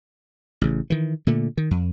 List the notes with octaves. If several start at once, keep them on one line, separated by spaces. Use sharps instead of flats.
A1 C#3
D#3 E3
A#2 D3 A3
D#3
F2